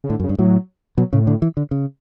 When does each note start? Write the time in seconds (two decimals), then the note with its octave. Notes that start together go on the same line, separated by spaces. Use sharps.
0.04 C#3
0.09 A2 D3
0.20 F#2
0.24 C#3
0.29 G2
0.39 A2 F#3
0.97 B2 F#3
1.13 A2 C#3
1.27 D3
1.42 E3
1.57 D3
1.71 C#3